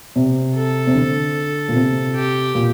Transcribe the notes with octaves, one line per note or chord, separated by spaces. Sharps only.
C3
A4
C3
D3
A#2
C3
G4
A#2